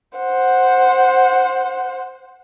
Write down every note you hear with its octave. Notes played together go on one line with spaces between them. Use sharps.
C5 F#5